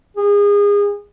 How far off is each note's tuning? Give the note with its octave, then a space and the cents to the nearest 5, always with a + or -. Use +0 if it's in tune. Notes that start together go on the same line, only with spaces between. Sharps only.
G#4 -30